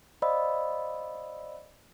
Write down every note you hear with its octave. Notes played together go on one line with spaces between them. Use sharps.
C5 D5 D#5 F5 B5 E6